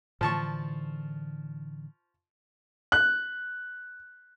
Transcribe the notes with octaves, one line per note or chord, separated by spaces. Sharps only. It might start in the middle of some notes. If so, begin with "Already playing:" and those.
A2 D3 E3 F3 A5 C#6
F#6